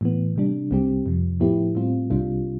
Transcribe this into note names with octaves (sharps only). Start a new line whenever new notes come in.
A2 E3 B3
C3 G3 D4
C2 C3 G3 C4 G4
F2 C3 F3
A2 F3 B3 E4 G4
A2 G3 C4 F4
C2 C3 G3 D4 F4